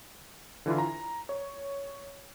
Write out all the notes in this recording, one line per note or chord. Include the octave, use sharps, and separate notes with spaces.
D3 E3 E4 F4
A#5
C#5